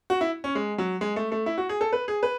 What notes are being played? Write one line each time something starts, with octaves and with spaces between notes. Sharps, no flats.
F#4
E4
C#4
G#3
F#3
G#3
A3
A3
E4
F#4
G#4
A4
B4
G#4
B4